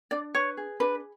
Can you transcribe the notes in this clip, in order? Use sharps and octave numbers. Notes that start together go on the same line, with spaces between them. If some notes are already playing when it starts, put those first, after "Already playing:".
D4 D5
B4 C#5
G#4
D4 B4